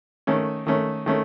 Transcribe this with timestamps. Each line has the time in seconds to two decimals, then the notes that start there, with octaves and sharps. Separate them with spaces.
0.27 D#3 A3 C#4
0.67 D#3 A3 C#4
1.06 D#3 A3 C#4